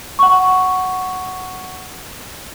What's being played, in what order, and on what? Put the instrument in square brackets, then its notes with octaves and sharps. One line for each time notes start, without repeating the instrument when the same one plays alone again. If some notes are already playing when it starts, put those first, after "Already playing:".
[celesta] F#5 C#6